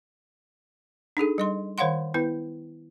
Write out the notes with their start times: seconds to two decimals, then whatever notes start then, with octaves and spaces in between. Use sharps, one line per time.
1.17 D4 D#4 G#4 A4
1.38 G3 D#5 C6
1.78 D#3 C5 C#5 F5 F#5 C6
2.14 B3 E4 B4